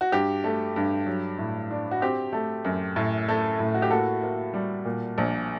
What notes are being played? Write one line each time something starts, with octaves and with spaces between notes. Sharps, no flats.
F#4
G2 G4
A3
G2
F#3
A2
D4
F#4
C4 G4
A3
F#2
A2
A3
A2
F#4
G4
A#3 F#4 A4
A#3
G3
A#2
A#1